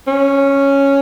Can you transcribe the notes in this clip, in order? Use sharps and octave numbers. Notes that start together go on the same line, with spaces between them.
C#4